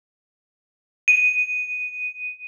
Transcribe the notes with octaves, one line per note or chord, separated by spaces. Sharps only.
D#7